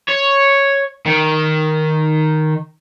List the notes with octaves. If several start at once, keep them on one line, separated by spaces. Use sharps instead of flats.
C#5
D#3